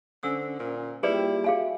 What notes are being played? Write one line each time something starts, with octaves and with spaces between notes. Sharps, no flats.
D3 C#4 C5 G#5 E6
A#2
G3 A#3 E4 F4 G4 G#4 B4 D5
F#4 G#4 E5 F5 G#5